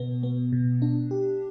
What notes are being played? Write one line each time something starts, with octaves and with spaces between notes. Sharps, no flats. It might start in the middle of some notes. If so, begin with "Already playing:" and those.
Already playing: B2 B3
B3
B2
D4
G4